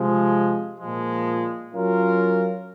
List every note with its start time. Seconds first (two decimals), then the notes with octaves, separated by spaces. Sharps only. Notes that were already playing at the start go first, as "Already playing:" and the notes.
Already playing: C3 F3 G#3
0.78 A#2 F3 G#3
1.73 F#3 C#4 F4 A#4